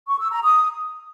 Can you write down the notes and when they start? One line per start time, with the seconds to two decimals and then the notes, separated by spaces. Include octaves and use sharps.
0.07 C#6
0.19 E6
0.30 A#5
0.42 D#6